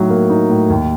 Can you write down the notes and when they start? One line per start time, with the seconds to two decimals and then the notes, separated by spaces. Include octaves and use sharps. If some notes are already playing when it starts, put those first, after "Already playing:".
Already playing: A2 F#3 D#4
0.10 A#3
0.30 D#4
0.50 A2
0.70 D#2